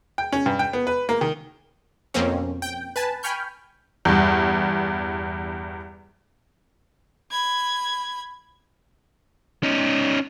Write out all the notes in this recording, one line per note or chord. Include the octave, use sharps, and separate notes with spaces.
G5
C#4
G2
G5
B3
B4
A#3
D#3
F2 B2 A#3 C4 C#4
G5
B4 G#5 A5
G5 G#5 B5 C#6 F6 G6
E2 G2
B5 G#6
C#4 D#4